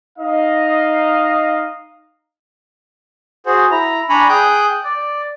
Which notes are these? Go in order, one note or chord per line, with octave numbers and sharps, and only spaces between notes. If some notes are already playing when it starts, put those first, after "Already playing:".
D#4 D#5 F5
F#4 G#4 C5
E4 A#5
D4 G#5 A#5 B5 C#6
G#4 G5 D#6 F#6 G6
D5